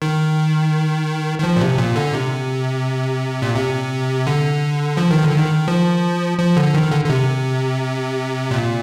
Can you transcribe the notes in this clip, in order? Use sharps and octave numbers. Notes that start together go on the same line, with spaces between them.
D#3
D#3
F3
A#2
C3
A#2
D3
C3
A#2
C3
D3
F3
D#3
D3
D#3
F3
F3
D3
D#3
D3
D3
C3
A#2